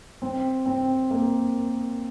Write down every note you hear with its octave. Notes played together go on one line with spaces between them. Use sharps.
C4
C4
A#3